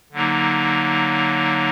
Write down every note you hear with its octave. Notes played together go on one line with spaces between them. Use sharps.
D3 F#3 A#3 D#4